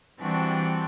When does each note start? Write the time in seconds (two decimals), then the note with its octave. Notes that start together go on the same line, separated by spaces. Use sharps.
0.18 E3 G3 C4 D4 F#4